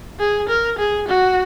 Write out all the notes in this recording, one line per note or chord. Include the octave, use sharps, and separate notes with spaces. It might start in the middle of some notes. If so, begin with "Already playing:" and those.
G#4
A#4
G#4
F#4